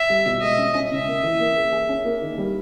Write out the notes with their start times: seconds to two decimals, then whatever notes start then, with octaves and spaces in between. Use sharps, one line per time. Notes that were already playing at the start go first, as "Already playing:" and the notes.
Already playing: E5
0.10 G3
0.26 B2
0.41 G#3 D#5
0.58 C#4
0.75 C#4
0.91 C#3 E5
1.08 A#3
1.23 E3
1.40 A#3
1.56 G#4
1.72 G#4
1.89 C#4
2.05 A#3
2.22 D#3
2.38 G3